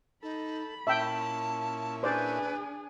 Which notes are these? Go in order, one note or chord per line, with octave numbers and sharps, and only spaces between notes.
D#4 A4 B5
A#2 C#4 E4 E5 G5 A5
D4 G#4 B4 C5 D5